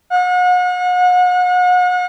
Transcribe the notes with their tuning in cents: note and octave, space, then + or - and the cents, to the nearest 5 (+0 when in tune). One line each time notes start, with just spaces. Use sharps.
F#5 -40